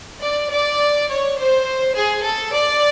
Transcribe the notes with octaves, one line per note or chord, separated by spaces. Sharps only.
D5
D5
C#5
C5
G#4
A4
D5